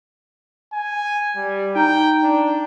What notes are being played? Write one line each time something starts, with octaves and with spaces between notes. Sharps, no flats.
G#5
G3
D#4 G5 A#5 G6
D4